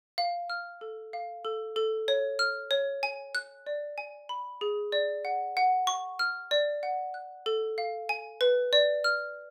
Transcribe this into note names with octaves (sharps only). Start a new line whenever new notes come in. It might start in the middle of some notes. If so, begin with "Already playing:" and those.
F5
F6
A4
F5
A4
A4
C#5
F6
C#5
G#5
F#6
D5
G#5
B5
G#4
D5
F#5
F#5
C#6
F6
D5
F#5
F#6
A4
F5
G#5
B4
D5
F6